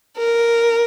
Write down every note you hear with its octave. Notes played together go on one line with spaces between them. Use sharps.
A#4